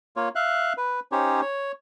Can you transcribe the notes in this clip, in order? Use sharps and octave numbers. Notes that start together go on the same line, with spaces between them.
A#3 F4 C#5
E5 F5 F#6
B4
C#4 D#4 G4 C5 C#5
C#5